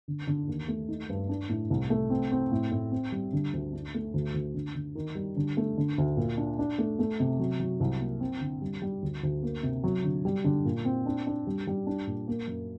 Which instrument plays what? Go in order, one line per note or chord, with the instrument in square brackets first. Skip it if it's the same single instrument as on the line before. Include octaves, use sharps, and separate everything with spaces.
[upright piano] D3
D3
D#2
A3
D#4
G2
D4
A2
C2
A3
C4
C4
A2
A2
C4
G3
D3
D2
D4
A3
D2
D2
D3
D3
D#3
G3
D3
A3
D3
D2
A#2
D4
D4
A3
A3
C3
F#3
F#3
C2
A#3
C4
D3
G3
G3
D2
D2
A#3
C3
F#3
D3
G3
D3
A#2
C4
D4
D4
G3
G3
D4
A#2
A#3
F#2